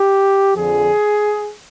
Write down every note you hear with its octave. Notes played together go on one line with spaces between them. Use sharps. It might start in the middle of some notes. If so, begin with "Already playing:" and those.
Already playing: G4
F2 D3 F3 G#4